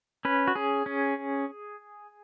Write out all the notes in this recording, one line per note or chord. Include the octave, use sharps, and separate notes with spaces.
C#4 B4
F#4
C#4 G#4
C#4